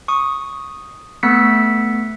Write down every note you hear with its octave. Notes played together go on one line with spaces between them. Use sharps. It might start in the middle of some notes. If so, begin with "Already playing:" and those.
C#6 D#6
A3 B3 E6 F#6 B6 C#7